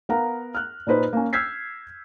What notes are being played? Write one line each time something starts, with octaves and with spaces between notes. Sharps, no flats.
B3 A#4 F5 F#5 A#5
F6 F#6
A#2 D#4 B4 C5
A#3 C#4
E6 F6 G6 G#6 B6 C7